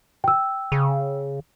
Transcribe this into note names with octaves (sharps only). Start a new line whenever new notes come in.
G5 E6
C#3